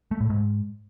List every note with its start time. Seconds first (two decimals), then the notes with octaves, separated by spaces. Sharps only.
0.11 A3
0.21 A2
0.30 G#2